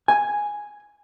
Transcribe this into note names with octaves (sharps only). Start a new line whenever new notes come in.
G#5